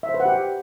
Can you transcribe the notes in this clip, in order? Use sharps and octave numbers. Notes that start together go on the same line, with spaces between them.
E5
C5
B4
F#5
G4